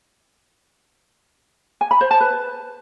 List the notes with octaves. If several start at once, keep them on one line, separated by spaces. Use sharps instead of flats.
G#5
B5
C5
A5
B4